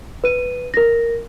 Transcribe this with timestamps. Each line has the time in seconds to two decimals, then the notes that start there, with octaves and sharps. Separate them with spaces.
0.24 B4 D#7
0.74 A#4 A#6